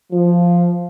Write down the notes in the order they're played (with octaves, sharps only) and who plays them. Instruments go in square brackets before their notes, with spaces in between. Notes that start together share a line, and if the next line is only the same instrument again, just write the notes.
[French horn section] F3